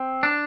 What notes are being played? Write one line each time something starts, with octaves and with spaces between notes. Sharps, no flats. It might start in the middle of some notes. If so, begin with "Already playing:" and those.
Already playing: C4
D4